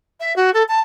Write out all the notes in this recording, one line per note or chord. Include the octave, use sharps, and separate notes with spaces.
E5
F#4
A4
A5